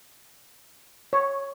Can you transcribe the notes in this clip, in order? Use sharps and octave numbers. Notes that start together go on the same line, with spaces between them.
C#5